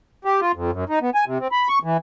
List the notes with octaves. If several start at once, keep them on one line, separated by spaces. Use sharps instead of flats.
G4
F4
F2
F#2
D#4
B3
G#5
C3
C4
B5
C#6
E3